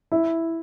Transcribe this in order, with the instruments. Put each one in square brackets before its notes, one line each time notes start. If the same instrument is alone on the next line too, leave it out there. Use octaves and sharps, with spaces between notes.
[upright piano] E4